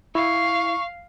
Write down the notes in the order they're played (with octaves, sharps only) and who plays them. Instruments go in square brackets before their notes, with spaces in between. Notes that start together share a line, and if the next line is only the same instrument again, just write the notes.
[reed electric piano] E4 [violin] F5 [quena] C#6